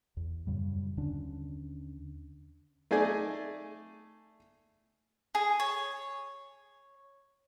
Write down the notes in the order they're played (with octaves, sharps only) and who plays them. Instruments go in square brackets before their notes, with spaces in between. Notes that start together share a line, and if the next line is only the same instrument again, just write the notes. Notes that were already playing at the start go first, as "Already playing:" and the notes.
[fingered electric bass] E2
F#2 A2 C#3 G3
D#2 D3 C#4 D4
[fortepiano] A3 D#4 G#4 D5 G#5
[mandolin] G#4
C#5